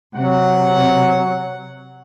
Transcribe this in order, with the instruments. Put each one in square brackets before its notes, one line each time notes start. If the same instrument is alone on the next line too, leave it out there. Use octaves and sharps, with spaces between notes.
[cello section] C3 [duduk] F#3 [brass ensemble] F#5